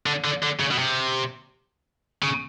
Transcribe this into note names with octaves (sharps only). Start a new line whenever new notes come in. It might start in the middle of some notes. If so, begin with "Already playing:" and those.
D3
D3
D3
C#3
B2
C3
C#3